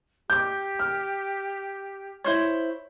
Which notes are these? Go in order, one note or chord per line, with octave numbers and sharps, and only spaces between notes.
G4 D6 G6
F6
E4 C5 C#5 D#5 C#6 G#6